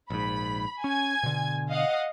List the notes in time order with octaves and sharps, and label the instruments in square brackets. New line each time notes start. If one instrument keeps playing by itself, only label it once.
[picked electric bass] A#1 G#2 [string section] B5
[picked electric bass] C#4 [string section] G#5 G#6
[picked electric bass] B2 D3
[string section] D#5 F5 F#5